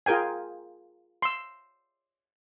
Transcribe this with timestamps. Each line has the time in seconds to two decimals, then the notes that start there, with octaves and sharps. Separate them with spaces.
0.06 F4 G#4 A#4 G5 G#5
1.22 C6 E6